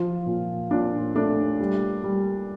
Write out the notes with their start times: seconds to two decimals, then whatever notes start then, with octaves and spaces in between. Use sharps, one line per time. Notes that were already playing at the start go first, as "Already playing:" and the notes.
Already playing: F3 F4
0.26 A#2
0.70 A#2 D4
1.15 A3 D4
1.60 G3
2.04 G3